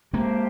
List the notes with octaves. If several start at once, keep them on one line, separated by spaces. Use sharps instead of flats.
G#3 A#3 G4 C5 F5 A5